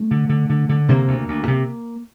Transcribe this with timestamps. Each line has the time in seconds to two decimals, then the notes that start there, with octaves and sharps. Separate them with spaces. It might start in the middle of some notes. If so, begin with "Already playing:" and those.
Already playing: A3
0.11 D3
0.29 D3
0.49 D3
0.69 D3
0.88 C3 A#3
1.08 D2
1.28 D2
1.48 C3